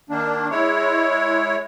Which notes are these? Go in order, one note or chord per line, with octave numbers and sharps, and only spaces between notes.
D#3 A#3 D4
G#3 E4 C#5